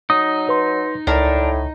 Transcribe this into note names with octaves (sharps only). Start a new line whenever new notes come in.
F#3 D#4 D#6
B4 C6
C#2 A2 D4 A#4